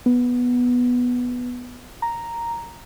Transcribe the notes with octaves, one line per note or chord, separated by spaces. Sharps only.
B3
A#5